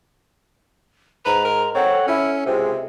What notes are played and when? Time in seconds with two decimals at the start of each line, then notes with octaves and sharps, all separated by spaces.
1.25 G#2 B4 A#5
1.45 A#4
1.75 C4 A4 C#5 F#5
2.07 C#4 E4
2.46 C#2 C3 G#3 C4